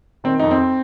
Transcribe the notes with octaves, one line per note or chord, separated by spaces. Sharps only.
D#3 C4
F2 D#4
C4